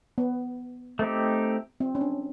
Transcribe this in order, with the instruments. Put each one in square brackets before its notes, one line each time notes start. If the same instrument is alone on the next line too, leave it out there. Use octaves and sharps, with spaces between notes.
[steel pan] B3
[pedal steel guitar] A3 C4 D#4 G4
[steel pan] C4
C#4
D4